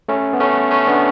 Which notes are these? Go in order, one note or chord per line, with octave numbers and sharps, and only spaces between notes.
A3 C#4
B3
A3 C#4
A3 C#4
B3 D4